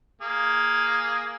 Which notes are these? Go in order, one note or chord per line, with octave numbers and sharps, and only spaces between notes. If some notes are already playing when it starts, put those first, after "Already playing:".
A#3 G#4